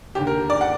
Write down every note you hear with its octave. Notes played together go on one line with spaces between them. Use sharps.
D#2 D3 G4
A#4
D5
F#5